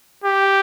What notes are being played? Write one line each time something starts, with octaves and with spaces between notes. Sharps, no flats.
G4